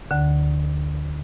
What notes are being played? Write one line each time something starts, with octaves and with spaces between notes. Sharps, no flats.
D2 D3